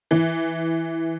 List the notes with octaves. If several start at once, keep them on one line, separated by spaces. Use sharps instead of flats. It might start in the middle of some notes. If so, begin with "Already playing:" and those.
E3